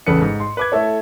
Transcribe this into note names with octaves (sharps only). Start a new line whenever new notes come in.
A1 E2 C#3 A4 B4 C#7
G#2
C6
B4 D6 G#6
A3 E4 A4 C#5